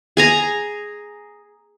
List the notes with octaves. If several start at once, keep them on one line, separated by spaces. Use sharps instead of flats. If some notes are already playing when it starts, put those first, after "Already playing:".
G#4 G#5 A#5